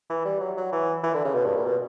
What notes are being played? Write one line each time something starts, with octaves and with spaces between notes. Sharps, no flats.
E3
G3
F#3
F#3
E3
E3
D3
C#3
B2
G2
A#2
B2